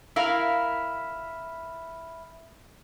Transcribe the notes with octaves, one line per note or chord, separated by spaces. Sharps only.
E4 A#4 E5 F5 B5 F6